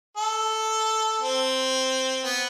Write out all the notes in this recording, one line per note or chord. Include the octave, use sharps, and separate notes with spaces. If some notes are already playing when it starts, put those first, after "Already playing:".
A4
C4
B3